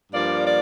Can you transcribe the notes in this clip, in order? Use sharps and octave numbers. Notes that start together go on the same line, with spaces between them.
G2 F3 A#3 D5
D5